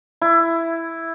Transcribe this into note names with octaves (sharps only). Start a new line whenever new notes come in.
E4